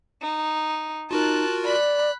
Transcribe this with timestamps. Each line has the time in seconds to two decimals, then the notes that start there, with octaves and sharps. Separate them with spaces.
0.22 D#4
1.11 D#4 F4 F#4 A#4 A5 F#6
1.65 D5 B5 F#6